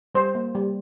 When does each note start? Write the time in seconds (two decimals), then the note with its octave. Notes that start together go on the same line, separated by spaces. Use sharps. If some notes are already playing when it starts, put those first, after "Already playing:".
0.15 G3 C5
0.35 A#3
0.55 G3